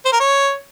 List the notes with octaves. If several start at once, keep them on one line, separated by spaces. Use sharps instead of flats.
C5
A#4
C#5